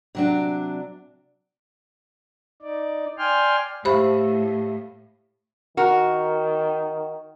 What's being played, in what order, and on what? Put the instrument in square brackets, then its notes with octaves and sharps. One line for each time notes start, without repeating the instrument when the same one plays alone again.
[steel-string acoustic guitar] C3 F#3 D4
[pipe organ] D#4 D5
D5 G5 G#5 C6 F6
[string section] A2 [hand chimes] G4 E5 F5 [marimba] C5 B5
[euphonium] D#3 [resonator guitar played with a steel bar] F#4 A#4